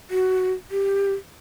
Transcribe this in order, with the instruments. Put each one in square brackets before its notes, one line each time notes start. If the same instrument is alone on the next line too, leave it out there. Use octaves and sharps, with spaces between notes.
[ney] F#4
G4